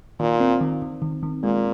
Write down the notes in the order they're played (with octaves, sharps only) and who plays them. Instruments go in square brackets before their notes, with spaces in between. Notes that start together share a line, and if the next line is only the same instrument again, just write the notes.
[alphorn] A#2 [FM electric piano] D#3
[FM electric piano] C4
D#3
D#3
D#3
D#3
[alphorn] A#2 [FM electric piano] G#3